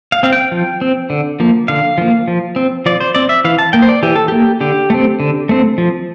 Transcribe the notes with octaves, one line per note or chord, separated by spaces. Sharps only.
F5
C4 F5
G5
F3
C4
D3
F3 A#3
D3 F5
F3 A#3
F3
C4
F3 D5
C5
C4 D5
E5
E3 F5
A5
A#3 G5
C5
D5
E3 G4
A4
A#3 G4
D3 G4
A3 C4
D3
A3 C4
F3